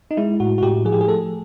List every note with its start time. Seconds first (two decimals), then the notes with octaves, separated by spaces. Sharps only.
0.11 D#4
0.17 G#3 E4
0.40 A2 F#4
0.58 F#4
0.62 A2 G4
0.85 F3 G#4
0.92 G4
1.01 G#4
1.08 A3 A4